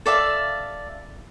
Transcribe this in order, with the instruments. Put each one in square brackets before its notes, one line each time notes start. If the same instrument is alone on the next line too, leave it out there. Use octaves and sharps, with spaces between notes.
[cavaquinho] A4 D5 E5 F5